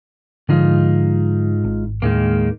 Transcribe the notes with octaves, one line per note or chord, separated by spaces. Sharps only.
G#2 D3 F3 D#4 F4
G#1
D#2 A2 D#3 G#3 A#3